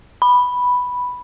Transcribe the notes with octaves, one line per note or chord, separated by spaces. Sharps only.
B5